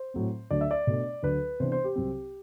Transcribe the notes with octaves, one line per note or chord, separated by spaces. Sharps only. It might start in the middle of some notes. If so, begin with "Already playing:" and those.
Already playing: C5
A2 F#3 C4
D2 D3 F#3 A3 D4 D5
E5
D5
B2 A3 D4
D2 D3 F#3 B4
C3 E3 B3 D4 C5
C5
G4
C2 C3 F#3 C4